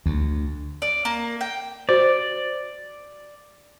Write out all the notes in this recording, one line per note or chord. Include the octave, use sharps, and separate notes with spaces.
D2
D5
A#3
G5
F#4 C5 D5